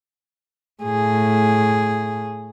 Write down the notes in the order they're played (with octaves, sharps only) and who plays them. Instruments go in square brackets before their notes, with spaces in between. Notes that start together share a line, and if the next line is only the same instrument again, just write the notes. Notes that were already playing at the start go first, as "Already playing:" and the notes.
[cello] A2 G#4